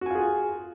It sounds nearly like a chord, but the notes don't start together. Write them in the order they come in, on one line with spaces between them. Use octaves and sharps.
F#4 G#5 F4 G#4